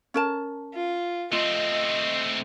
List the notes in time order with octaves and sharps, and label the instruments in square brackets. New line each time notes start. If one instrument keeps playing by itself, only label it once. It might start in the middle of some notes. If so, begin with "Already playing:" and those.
[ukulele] C#4 A#4 A5
[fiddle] F4
[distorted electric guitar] A3 C4 [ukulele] F4 [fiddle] D#5